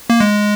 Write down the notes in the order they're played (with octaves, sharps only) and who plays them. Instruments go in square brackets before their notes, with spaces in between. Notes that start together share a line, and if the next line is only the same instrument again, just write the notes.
[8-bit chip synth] A#3
G#3